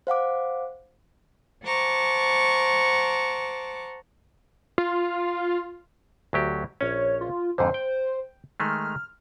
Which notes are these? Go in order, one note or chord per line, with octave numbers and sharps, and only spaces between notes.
C5 F5 F#5 D6
C5 F#5 A5 A#5 C#6 D6
F4
D2 F#3 G4
A#1 C#4 C#5
F4
F2 G#2 D3 C5
G5
D#3 G#3 A3 F6